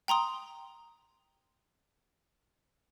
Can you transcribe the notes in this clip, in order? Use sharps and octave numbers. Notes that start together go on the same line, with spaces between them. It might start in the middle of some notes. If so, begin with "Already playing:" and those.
G5 A#5 C6 D#6